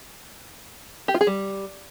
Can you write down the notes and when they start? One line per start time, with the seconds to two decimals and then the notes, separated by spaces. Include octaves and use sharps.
1.08 G4
1.14 F4
1.21 G#4
1.27 G3